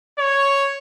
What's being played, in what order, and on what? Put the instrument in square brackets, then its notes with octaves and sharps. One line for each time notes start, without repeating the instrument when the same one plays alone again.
[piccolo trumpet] C#5